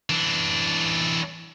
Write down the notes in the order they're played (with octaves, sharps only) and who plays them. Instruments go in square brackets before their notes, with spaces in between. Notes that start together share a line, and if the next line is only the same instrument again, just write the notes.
[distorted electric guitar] E3 D4